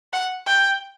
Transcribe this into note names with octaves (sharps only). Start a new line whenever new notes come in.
F#5
G5